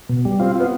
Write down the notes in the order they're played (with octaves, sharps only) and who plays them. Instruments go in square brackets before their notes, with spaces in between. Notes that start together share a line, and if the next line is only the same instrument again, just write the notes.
[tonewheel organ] B2
G3
[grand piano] C4 [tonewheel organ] F4
[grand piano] B3 [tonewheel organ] F4